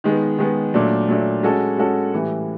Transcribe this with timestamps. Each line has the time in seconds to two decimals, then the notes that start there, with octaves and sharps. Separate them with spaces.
0.04 D#3 G#3 B3
0.38 D#3 G#3 B3
0.74 A#2 F#3 A3 D4
1.08 A#2 F#3 A3 D4
1.43 G#3 C#4 F#4 A4
1.78 G#3 C#4 F#4 A4
2.13 A2 E3 G3